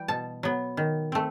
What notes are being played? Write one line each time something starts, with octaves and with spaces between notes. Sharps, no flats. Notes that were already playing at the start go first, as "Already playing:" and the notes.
Already playing: E3 G3 G5
B2 A5
F#3 B3
D#3
A3 C4